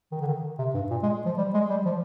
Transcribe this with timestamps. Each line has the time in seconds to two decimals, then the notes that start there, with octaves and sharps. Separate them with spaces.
0.12 D#3
0.21 D3
0.28 D#3
0.59 C3
0.74 G2
0.91 A#2
1.03 G#3
1.26 F3
1.38 G3
1.54 G#3
1.70 G3
1.86 F3